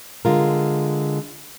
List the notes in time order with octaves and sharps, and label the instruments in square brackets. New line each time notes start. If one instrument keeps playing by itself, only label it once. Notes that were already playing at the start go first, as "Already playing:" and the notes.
[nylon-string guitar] D3 G#3 F4 A#4